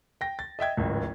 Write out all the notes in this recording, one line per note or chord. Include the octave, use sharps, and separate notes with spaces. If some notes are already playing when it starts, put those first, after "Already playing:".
G5 A#6
A6
D#5 E5 G5 G#6
D1 G#1 C#2